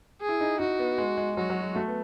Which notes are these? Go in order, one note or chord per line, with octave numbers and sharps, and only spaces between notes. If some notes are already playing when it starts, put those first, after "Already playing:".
G#4
E4
D#4
D#4 F#4
B3
G#3
G#3
F#3 F#4
F#3
G#3
A3
B3